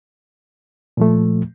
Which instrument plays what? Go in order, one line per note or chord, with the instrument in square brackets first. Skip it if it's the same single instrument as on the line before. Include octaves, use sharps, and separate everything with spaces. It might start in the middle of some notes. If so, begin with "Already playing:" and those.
[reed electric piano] A#2 F3 A3